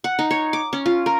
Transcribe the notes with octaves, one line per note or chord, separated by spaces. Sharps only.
F#5
D#4
C#5
D6
C#4
F4
A#4